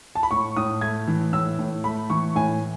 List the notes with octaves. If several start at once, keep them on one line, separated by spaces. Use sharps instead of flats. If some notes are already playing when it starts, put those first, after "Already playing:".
A5
B5
A2 C#6
A2 D#6
A3 G#6
E3
A2 E6
A2
A3 B5
E3 C#6
A2 G#5